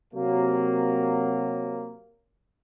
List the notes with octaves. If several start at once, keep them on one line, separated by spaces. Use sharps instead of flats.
C3 F#3 A#3